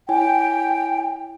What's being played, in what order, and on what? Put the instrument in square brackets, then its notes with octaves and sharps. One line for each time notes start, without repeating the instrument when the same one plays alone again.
[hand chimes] E4 C#5 G#5 [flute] G5